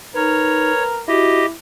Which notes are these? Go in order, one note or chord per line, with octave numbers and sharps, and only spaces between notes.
D#4 A#4 B4 C#5
E4 F#4 G4 D#5